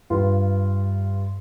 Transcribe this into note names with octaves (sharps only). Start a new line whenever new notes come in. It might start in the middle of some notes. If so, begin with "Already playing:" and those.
G2 F4 B4